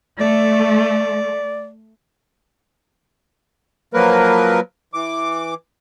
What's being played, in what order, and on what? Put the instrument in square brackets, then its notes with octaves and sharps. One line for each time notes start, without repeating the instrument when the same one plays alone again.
[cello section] A3 [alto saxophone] D5
[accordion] F3 F#3 A#3 A#4 B4
E3 D6